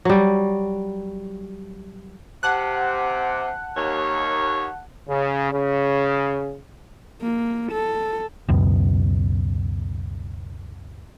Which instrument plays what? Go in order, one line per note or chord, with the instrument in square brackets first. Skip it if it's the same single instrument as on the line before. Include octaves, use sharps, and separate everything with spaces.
[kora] F#3 G3
[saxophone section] C3 [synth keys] F#5 A5 F#6
[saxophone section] D#2 C#5
[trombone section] C#3
C#3
[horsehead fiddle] A#3
A4
[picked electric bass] C#2 F#2 B2